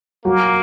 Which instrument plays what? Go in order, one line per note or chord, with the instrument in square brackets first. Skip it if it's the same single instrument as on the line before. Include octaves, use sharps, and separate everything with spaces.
[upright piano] F#3 F#4 [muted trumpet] A#3